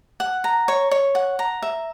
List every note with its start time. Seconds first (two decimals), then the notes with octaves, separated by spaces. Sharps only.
0.20 F#5
0.44 A#5
0.68 C#5
0.91 C#5
1.15 F#5
1.39 A#5
1.62 E5